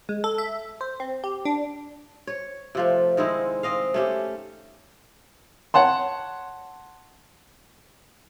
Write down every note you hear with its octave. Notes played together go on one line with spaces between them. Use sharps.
G#3
A4
E5
C5
C4
G4
D4
C#5
C3 F3 A3
D#3 G#3 C4 E4
C4 D#5 F5
A3 C#4 G4
C#5 F#5 A5 C6